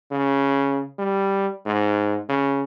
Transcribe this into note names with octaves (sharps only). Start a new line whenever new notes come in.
C#3
G3
G#2
C#3